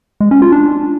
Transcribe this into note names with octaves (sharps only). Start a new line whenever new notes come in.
G#3
C#4
F4
D4